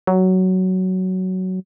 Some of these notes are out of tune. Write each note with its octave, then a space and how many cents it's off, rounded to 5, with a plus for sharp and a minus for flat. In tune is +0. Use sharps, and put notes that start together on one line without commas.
F#3 +10